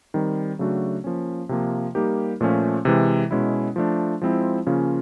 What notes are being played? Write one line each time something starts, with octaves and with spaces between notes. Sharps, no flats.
D#3 G3 C4
C#3 F#3 A3 D4 F#4
F3 A#3 C#4
C3 F3 A#3
G3 A#3 D#4 G4 A#4
A#2 F3 A3 C#4
C3 E3 G#3
B2 G#3 C#4 E4
F3 A3 D4
F3 G#3 C4 E4
C#3 F3 A#3 C#4 F4